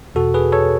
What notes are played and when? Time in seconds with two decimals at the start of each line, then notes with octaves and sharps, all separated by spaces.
0.15 E2 B2 F#4 A4
0.34 G#4 B4
0.52 A4 C#5